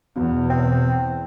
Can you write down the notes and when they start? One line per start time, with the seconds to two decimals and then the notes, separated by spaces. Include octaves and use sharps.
0.16 E2 B2
0.50 C4